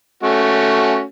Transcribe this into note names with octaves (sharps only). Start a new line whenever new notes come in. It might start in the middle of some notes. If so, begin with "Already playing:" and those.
A3 C#4 F#4